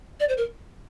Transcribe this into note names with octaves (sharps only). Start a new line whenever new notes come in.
D5
C5
A#4